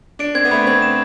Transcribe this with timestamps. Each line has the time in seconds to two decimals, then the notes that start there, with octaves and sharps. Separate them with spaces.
0.19 D4 D7
0.35 C4 G#6
0.45 B3
0.51 A3 B5
0.67 C4 G#6
0.82 E7